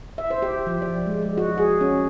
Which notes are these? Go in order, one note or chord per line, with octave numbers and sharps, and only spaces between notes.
E5
C5
G4
F3
D5
G#3
G#3
F#4
G#4
C#4